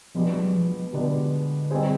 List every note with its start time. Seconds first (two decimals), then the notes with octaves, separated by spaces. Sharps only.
0.15 B2 F3 G#3 B3 D4 G4
0.34 F#3
0.53 F3
0.93 B2 D3 G#3 B3 D4 G4
1.71 G3 C4 D#4 G#4 C5